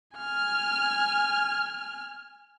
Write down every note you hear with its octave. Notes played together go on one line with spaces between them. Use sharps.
G#5 F6